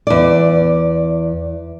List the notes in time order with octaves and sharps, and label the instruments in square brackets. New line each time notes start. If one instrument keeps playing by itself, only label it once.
[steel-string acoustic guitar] E2 D5